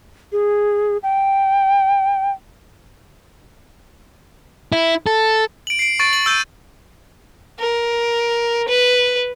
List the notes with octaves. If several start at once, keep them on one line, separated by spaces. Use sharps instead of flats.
G#4
G5
E4
A4
D7 F#7
C7 D7
C#6 A6 D7
F#7
E6 G6 D7 D#7
A#4
B4